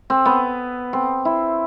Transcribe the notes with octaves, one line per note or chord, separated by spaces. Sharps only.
C4
B3
C4
E4